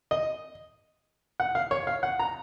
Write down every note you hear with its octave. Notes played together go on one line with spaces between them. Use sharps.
D#5
F#5
F5
C#5
F5
F#5
A#5